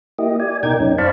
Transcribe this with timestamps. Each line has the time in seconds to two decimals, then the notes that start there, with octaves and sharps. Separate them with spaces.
0.18 A#3 E4 G4 D#5
0.40 D5 G#5
0.63 B2 D#4 A#4 G5 G#6
0.80 F#2 C#4 D#4
0.98 C5 D5 F5 A5 B5 C#6